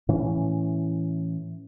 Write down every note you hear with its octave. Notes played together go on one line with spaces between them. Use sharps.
A2 E3 C#4